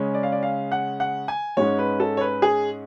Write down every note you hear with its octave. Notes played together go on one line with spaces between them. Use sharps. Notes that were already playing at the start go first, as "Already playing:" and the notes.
Already playing: C#3 G#3 C#4
D5
F5
D5
F5
F#5
F#5
G#5
G#2 G#3 C#4 C#5
B4
A4
C#5
B4
G#4